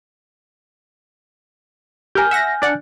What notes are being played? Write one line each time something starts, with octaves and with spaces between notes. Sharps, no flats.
G4 A#4 G#5 F6 G6
E5 F#5 A#6
D4 D5 F#5